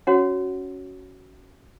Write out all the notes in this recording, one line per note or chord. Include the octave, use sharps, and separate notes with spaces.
C#4 F#4 C#5 F#5